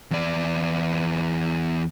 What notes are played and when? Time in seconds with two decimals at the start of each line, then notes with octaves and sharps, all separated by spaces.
0.11 E2 D5